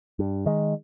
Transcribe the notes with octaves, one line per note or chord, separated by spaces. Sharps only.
G2
D#3 G#3